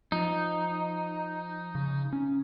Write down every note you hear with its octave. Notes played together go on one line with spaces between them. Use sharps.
F3 D#4
C#3
C#4